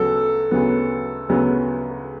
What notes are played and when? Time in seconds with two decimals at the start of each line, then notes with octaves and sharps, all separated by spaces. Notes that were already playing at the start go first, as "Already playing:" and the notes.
Already playing: D2 C#3 F#3 B3 A4
0.51 D2 C#3 F#3 B3
1.29 D2 C#3 F#3 B3